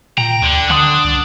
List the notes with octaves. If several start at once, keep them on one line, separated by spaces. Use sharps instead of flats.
A#2 G5 A#5
D2 D3
D3 D4 F#5 C6 D#6
C2